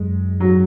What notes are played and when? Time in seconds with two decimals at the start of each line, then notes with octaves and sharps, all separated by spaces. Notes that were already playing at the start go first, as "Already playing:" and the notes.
Already playing: F#2 G#3
0.40 F#3